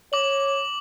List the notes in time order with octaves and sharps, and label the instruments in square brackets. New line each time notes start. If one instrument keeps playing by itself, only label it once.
[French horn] C#5 [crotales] D6 F#7